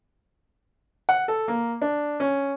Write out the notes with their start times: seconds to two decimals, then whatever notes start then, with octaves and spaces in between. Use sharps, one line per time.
1.09 F#5
1.28 A4
1.48 A#3
1.81 D4
2.20 C#4